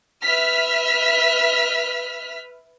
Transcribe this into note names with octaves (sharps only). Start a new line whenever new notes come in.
B4 E5 F6 B6